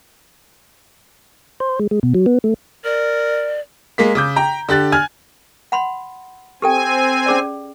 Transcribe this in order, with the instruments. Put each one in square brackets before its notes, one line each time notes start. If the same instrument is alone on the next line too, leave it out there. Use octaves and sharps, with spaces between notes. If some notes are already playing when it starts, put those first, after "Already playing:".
[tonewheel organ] C5
G#3
G#3
B2
F#3
B3
A3
[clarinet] A#4 [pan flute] D5
[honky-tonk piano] G#3 A#3 B6
C#3 D6 G6
G5 A#5
D3 G4 F#6 A6
G#5 F6 G#6
[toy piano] F#5 B5 C6
[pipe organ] C4 G#5 [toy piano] G4 A4 G5
[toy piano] C#4 G#4 D5